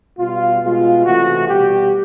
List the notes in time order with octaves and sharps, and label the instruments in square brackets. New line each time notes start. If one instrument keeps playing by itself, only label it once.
[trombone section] B2 G3 F4
B2 G#3 F4
C3 E3 A3 F#4
B2 G3 G4